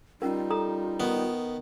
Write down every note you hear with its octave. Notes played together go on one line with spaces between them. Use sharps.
G3 C#4 D#4 F4 A#4
A4 A#5 D#6
D#3 B3